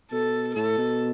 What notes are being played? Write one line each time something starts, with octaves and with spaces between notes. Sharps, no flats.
B2 A4
A2 A4
B2